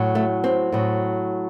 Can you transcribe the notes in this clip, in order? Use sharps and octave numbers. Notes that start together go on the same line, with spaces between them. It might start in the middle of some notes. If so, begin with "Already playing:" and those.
Already playing: A2 F#3
A3
C4
A2 F#3